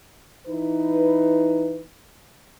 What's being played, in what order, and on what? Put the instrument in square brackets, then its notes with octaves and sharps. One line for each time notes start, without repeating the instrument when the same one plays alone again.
[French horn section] E3 D#4 B4